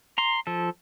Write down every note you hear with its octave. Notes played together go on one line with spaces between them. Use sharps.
A#5 C6
F3 A4